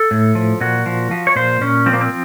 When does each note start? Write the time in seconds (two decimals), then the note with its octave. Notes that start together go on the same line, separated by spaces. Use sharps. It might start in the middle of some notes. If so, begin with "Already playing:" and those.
Already playing: A4
0.11 A2
0.35 F3
0.60 A#2 F#4
0.86 F3
1.11 F3
1.27 C#5
1.36 A#2 C5
1.61 A#2 C#4
1.86 F3 C4
1.93 A#3
2.01 C4